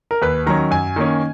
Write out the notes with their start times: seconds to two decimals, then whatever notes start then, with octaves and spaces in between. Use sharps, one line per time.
0.11 A#4
0.22 D#2 B4
0.46 D#3 F#3 C#4 A#5
0.71 F#2 G#5
0.96 D#3 A#3 C#4